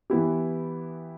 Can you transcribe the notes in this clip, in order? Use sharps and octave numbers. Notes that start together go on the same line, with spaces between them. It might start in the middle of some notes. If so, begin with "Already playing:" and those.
E3 B3 E4 G4